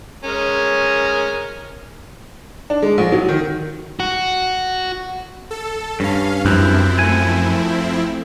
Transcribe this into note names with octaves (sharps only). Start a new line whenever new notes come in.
G#3 C#4 A#4
D4
G#3
A#1
F#3
D#3
F#4
A4
G2 C#4 F5
F#2 F3 C4 E4
A3 G#5